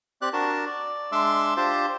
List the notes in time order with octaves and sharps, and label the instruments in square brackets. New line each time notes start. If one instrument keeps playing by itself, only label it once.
[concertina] C4 G4 D5 F#6
D4 F#4 A#4 A5
D5
G#3 D4 E5 C6 D6 E6
D4 F4 G4 C5 A5